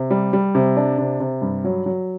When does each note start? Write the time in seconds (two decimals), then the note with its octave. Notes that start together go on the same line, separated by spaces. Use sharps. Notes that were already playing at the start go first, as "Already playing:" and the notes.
Already playing: C3
0.11 G3
0.33 G3
0.55 C3
0.77 D4
0.98 C3
1.20 C3
1.42 G2
1.65 F#3
1.86 F#3